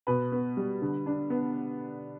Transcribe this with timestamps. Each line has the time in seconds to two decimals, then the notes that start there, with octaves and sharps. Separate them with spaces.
0.07 B2 B4
0.32 B3
0.57 G3
0.82 D3
1.06 D4
1.30 B3